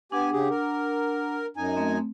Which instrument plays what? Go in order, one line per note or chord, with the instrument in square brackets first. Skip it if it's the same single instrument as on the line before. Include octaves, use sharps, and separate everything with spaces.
[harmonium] B3 G4 G#5 [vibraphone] D4 F#5
[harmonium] C#3 G4 G#4
A#4
F#2 D#4 G#5
[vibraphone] A3 C4